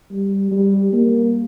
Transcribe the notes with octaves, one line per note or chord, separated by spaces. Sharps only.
G3
G3
A#3